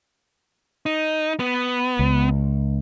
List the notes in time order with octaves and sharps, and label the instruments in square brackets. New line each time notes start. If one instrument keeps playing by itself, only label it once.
[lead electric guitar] D#4
B3
[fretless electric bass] C#2